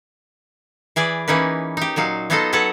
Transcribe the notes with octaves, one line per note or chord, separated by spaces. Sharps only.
E3 G#4 B4 D5
E3 A#3 C#4 D#4 B4
D#4 G4
A#2 F#3 D#4 F5
F#3 B3 D#4 F4 A4 D#5
F#3 A4 B4 C#5 F#5 A5